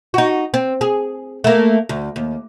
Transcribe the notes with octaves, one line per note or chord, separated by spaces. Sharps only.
D#4 F#4
C4
G#4
A3 A#3
D2
D#2